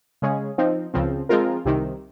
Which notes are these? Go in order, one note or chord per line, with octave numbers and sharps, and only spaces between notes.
C#3 G#3 C#4 G#4
F3 C4 D#4
C#2 C#3 F3 C4
F3 G#3 C4 F4 A#4
C2 C3 D#3